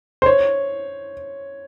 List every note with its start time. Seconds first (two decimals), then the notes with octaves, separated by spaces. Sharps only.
0.22 C5
0.26 C#5